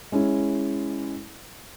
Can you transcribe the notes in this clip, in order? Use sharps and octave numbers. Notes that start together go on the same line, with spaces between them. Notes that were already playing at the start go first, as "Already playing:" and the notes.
G#3 C#4 E4